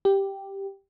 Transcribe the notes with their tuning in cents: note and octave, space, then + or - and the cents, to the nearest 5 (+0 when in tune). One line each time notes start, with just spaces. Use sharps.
G4 +0